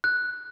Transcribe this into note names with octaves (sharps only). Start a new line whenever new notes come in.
F#6